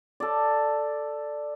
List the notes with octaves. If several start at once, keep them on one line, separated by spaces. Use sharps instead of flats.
A4 D5